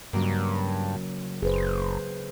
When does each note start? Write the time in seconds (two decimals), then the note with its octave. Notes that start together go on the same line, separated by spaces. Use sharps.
0.13 G2 C#3 F#3 A#3
1.42 F#1 G#4 B4 C5